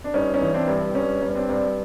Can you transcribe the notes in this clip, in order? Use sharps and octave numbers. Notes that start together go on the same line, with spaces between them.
D4
G2 C#4 D#4
C#4 D#4
E3
C4 D4
G2
C4
G2 C#4
G2
C#4
C4 D4
G2